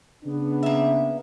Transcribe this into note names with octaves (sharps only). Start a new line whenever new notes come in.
C#3 B3 D4
A#3 E5